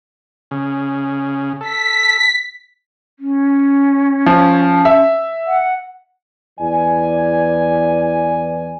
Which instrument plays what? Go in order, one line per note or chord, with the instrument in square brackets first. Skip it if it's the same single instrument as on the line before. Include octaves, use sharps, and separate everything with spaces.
[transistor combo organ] C#3
[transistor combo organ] A4 [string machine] B6
[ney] C#4
[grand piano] F3
E5
[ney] F#5
[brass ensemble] E2 E3 D5 G#5